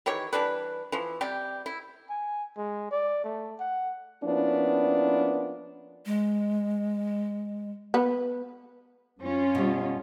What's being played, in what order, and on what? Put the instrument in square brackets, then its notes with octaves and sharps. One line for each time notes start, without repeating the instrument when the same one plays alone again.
[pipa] D#3 E3 G4 C#5
E3 G3 D4 B4
E3 F3
C3 G3 G4
E4
[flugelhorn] G#5
G#3
D5
A3
F#5
[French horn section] F3 A#3 B3 C#4 D4 E4
[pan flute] G#3
[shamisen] B3
[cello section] F#2 C#4 F4
[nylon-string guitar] B2 G3